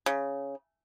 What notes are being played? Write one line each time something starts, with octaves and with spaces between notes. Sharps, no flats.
C#3